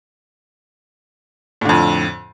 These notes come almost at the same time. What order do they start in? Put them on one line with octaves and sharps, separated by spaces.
A2 D3 F2